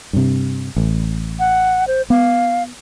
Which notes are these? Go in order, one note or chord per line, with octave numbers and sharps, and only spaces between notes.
G2 C3
A1
F#5
C5
B3 F5